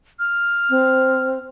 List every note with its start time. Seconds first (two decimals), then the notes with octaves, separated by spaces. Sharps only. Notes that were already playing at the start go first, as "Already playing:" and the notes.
0.19 F6
0.70 C4